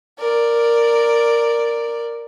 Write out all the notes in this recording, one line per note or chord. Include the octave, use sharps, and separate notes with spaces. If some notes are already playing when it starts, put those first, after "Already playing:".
A#4 D5